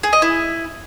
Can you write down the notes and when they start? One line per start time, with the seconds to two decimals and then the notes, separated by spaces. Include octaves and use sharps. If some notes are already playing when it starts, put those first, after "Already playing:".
0.03 G#4
0.13 D#5
0.22 E4